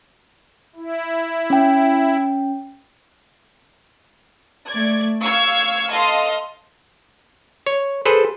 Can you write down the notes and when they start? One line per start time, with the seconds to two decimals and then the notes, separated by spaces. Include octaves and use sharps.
0.75 E4
1.50 C#4 G5
4.68 A3 D5 G#6
5.21 F5 C#6 E6 F6 G#6
5.91 A4 D#5 F5 C6
7.66 C#5
8.05 G#4 A4 B4 C5